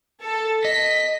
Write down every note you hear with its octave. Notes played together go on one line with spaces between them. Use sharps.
A4
D#5 B6